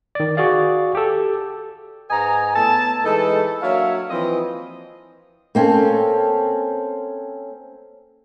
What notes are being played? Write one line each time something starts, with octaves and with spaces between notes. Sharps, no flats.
D#3 D5
F#4 G#4 D5 F5
G4 A4
G#2 B4 D#5 G#5 A#5
A2 B3 A4 A5
E3 G#3 D#4 A4
F#3 A#3 D4 C#5 E5 F5
E3 F3 C4 D#5
A#3 C4 C#4 A4